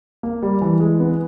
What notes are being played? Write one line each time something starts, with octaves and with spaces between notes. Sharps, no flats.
A#3
G3
E3
G#3
B3